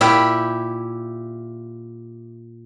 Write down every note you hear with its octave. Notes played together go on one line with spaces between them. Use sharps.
A#2 E4 G4 E5